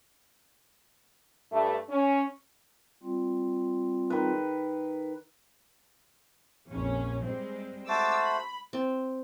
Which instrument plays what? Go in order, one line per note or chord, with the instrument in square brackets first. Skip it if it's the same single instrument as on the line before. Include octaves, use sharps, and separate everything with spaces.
[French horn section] G2 A3
C#4
[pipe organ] G3 C4 F4
[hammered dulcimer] D#3 B4
[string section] A#1 F2 C#4
G3 G#3 C4
[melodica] A3 F#4 C5 [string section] D6 E6 A6
[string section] B5
[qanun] C4